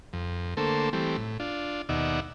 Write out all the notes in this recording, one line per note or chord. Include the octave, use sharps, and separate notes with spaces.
F2
D3 A3 A#3 A4 C5
E3 G3 A3 C4
A2
D4 F4
D#2 B2 D#4 D5 E5 F#5